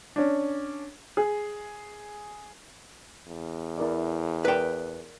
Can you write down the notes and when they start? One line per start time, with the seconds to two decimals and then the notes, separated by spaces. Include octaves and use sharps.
0.16 C#4 D4
1.17 G#4
3.27 E2
3.78 E4 A#4 D5
4.45 A#4 B4 D5 G5